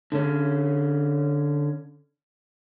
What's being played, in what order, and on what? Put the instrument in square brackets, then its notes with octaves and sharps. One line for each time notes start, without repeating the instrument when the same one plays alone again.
[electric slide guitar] D3 C#4